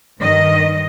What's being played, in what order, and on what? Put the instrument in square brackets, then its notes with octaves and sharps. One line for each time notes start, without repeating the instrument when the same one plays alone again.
[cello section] G2 D#3 D#5